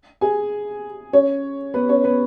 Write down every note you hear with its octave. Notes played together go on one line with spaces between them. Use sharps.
G#4 G#5
C#4 C#5
B3 B4
C#4 C#5
B3 B4